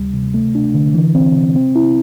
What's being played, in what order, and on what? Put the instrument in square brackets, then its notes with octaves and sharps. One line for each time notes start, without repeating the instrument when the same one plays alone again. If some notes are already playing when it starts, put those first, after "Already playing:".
Already playing: [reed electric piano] D2 G3
C3
A3
D4
D3
E3
C4
C3
C4
E4